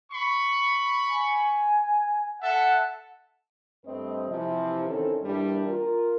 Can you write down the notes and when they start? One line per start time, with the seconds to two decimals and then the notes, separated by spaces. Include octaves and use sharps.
0.11 B5 C#6
1.09 G#5
2.42 A4 E5 F#5 A5
3.85 G2 A3 C4 B4 D#5
4.28 C3 E3 F3
4.85 D#3 C4 C#4 E4 A4
5.22 G2 E3 G3 A#3 D4
5.67 F4 A#4